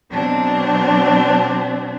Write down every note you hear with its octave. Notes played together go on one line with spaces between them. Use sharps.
B2 F#3 C4 D4